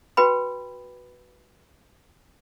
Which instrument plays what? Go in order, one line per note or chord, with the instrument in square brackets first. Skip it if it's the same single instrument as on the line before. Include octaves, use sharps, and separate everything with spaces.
[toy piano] F#4 B4 G5 B5